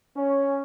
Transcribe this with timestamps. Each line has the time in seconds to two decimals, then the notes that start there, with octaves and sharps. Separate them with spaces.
0.16 C#4